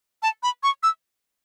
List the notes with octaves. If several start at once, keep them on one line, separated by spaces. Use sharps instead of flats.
A5
B5
C#6
E6